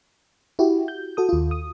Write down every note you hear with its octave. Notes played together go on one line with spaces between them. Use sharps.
E4 F#4 G4
G6
F#4 A4 D#6
D#2 F4
D#6